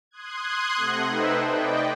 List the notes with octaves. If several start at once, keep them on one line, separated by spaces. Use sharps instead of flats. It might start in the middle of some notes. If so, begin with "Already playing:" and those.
C6 D#6 F#6 G#6
C3 A3 F#5 A#6
D#4 A4 B4 C5 E5 G5
D5 D#5 G5